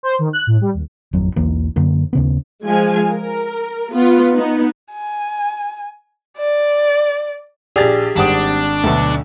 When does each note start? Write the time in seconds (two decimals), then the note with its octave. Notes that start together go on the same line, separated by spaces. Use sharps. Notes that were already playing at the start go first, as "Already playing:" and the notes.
0.03 C5
0.19 D#3
0.33 F#6
0.47 A2
0.61 G3
0.74 D#2
1.13 D#1 G#1 F2 F#3
1.36 B1 E2 E3 A#3
1.76 F#2 D3 A#3
2.13 D#2 C#3 B3
2.66 F3 G#3 F5 G#5
3.12 A#4
3.94 B3 F4 B4
4.34 B3 D#4
4.92 G#5
6.37 D5
7.76 A#1 G4 G#4 D5 A6 F7
8.17 G#1 G3 C4 D4 F#5 D#6
8.84 D2 B2 F#3 A3